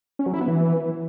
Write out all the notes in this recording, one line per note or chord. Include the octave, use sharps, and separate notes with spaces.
C#4
F#3
E4
B3
E3